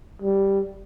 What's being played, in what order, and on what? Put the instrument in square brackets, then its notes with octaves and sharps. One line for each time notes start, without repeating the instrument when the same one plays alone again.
[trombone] G3